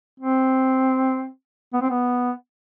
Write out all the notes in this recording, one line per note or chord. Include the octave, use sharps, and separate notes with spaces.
C4
B3
C4
B3